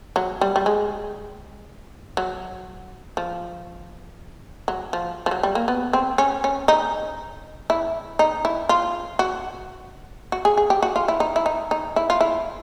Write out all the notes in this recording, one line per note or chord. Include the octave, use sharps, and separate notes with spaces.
F#3
G3
G3
G#3
F#3
F3
F#3
F3
F3
F#3
G3
A#3
B3
C4
C#4
C#4
D#4
E4
D#4
E4
F4
F#4
F#4
G#4
G#4
G4
F#4
F4
E4
D#4
E4
D#4
D#4
E4
F4
E4